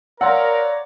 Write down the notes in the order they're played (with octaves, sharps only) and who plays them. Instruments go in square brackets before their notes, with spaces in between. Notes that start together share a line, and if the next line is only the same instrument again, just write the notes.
[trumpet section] A#4 [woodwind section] C#5 D5 A#5 [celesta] F5 C6 E6 [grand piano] F#5